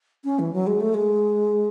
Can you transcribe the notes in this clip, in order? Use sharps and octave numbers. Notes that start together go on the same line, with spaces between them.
C#4
E3
F#3
G#3
A3
G#3